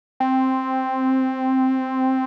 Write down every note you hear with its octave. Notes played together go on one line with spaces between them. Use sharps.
C4